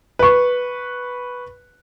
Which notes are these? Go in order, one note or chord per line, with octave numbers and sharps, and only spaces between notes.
B4 C#6